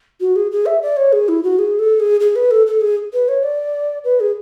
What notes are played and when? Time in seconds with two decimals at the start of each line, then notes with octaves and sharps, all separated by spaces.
0.20 F#4
0.36 G#4
0.51 G#4
0.66 E5
0.82 D5
0.97 C#5
1.12 G#4
1.28 E4
1.43 F#4
1.59 G#4
1.79 A4
2.00 G#4
2.20 G#4
2.36 B4
2.51 A4
2.67 A4
2.81 G#4
3.13 B4
3.28 C#5
3.43 D5
4.04 B4
4.20 G#4